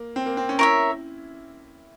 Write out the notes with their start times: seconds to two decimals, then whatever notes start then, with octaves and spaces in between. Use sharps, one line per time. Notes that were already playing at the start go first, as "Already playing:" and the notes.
Already playing: A#3
0.16 C4
0.26 A#3
0.37 C4
0.49 C#4
0.59 E4 A#4 C#5 E5